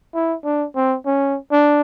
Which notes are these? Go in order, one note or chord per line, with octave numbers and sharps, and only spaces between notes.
E4
D4
C4
C#4
D4